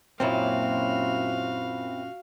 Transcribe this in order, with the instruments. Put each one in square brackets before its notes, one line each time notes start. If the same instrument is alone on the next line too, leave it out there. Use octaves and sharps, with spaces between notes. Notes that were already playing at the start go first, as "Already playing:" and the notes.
[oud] F#2 A#2 C#4 [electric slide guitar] C4 E4 [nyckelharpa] F#4 F5